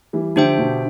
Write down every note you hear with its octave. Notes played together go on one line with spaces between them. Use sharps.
E3 G3
D3 F3 D4 G4 C5 E5 G5
B2 D3